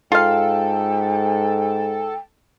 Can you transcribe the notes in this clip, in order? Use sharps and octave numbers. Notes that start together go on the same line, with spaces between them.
G#2 F4 A4 F5 G5